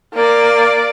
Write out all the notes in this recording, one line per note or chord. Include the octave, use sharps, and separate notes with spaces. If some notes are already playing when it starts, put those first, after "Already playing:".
A#3 D5